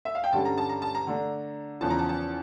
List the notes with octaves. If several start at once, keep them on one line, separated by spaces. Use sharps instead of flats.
E5
F5
G5
G2 D3 G3 C#4 A5
A#5
A5
A#5
A5
A#5
D3 A3 D4
E2 C#3 F3 C#4 A5
A#5
A5
A5